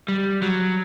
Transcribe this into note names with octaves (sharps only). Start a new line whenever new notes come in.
G3
F#3